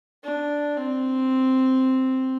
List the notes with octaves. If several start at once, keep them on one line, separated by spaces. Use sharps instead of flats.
D4
C4